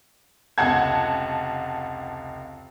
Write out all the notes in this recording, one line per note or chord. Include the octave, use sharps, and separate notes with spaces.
F1 C#2 F#5 A5 G#6